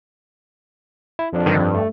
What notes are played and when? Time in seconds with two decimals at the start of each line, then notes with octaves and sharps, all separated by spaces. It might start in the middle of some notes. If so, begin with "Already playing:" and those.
1.19 E4
1.33 F2 F3 D4
1.46 G2 D3 D#3
1.59 G2
1.74 A3